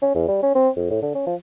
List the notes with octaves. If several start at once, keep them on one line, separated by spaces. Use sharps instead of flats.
C#4
E2
G3
C#4
C4
F2
A2
D3
C#4
F3